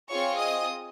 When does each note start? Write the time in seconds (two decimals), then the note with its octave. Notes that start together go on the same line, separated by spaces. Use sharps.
0.10 C4 F4 G#4 C#5 C#6
0.39 D#5 D#6